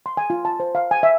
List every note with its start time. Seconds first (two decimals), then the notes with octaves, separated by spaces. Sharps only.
0.06 C6
0.17 G#5
0.30 F4
0.45 A5
0.60 C5
0.75 F5
0.91 G#5
1.03 E5